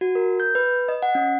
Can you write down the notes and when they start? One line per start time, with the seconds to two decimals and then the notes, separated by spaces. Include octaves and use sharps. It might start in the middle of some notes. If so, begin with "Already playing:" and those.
0.01 F#4
0.15 A#4
0.40 G6
0.55 B4
0.88 D#5
1.02 F#5
1.15 C#4